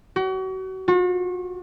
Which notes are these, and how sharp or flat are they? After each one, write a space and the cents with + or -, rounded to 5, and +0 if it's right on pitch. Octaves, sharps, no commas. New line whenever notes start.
F#4 +35
F#4 -45